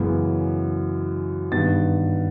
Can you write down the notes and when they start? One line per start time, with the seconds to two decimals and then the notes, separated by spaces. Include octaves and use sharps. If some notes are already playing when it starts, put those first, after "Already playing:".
Already playing: F#2 C#3 E3 G#3 B3
1.52 G2 D#3 G3 B3 A6